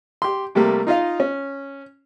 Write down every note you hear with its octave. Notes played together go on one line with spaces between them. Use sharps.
G4 C6
C3 G3 A3 A#3
D#4 F4 D#5 F5
C#4